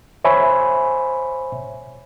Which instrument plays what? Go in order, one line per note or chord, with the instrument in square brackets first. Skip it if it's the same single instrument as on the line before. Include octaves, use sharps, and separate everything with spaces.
[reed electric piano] C5 C#5 E5 G#5 B5